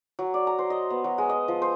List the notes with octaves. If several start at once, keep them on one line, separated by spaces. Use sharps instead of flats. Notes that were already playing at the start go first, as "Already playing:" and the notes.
F#3
D5
A#5
C5
D#5
B3
F#3
G#3
D#5
F3
C5